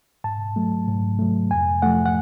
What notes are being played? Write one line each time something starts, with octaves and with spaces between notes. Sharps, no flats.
G#2 A5
F#3 A3
G#2
F#3 A3
F2 G#5
F3 A3 F#5
F#5